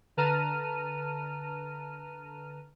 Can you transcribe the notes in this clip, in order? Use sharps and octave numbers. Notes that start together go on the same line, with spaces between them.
D3 B4 A5 A#5 F6 D#7